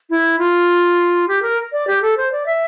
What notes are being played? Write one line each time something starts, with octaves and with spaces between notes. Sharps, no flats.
E4
F4
G4
A#4
D5
G4
A4
C5
D5
E5